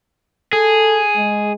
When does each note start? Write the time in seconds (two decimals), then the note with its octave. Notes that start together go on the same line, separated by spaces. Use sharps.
0.53 G#4 A4
1.17 G#3